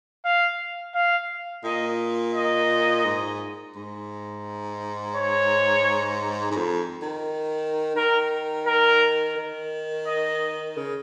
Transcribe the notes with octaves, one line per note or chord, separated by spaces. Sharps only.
F5
F5
A#2 D#5
D#5
G#2
G#2
C#5
G#2
F2
D#3
D#3 A#4
A#4
D#3
D#5
C#3